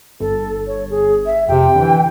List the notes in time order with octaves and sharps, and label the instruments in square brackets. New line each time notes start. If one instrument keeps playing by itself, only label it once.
[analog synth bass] G1 [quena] A4
[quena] C#5
G#4
E5
[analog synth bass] F2 [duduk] C3 [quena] G5
[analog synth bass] D3 [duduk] E3